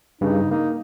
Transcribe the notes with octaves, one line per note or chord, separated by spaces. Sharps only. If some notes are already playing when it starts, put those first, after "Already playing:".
G2 C#3 D#4
A#3 D#4